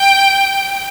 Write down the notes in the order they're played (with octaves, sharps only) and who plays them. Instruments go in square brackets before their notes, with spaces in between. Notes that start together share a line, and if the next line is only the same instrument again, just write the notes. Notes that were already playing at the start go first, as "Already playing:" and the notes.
Already playing: [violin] G5